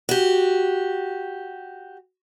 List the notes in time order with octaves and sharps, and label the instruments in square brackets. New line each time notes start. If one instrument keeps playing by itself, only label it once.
[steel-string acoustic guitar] F#4 G4